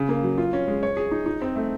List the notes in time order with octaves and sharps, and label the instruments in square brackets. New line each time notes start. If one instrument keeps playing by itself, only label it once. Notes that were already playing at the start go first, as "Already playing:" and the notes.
Already playing: [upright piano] C#3
A#3
F#3
F4
C#4
G#3
C#5
G#4
D#4
D#4
C4
A3